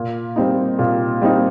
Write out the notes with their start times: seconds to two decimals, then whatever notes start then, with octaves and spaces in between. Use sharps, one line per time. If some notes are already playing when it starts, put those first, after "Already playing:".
Already playing: A#2
0.36 G3 C4 D#4
0.79 A#2
1.21 G3 C4 D#4